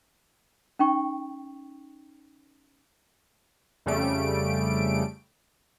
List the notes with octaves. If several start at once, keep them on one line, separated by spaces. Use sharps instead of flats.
C#4 D#4 G5 C#6
F2 C#3 G3 A3 D7